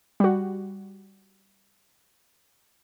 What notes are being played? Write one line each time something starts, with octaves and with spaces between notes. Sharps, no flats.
G3 F#4